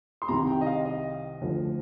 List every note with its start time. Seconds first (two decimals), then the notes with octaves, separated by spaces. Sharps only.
0.22 C6
0.28 C2 C3 D#3 A#5
0.47 G5
0.61 D#5
0.66 F5
0.85 D#5
1.41 D2 D3 F3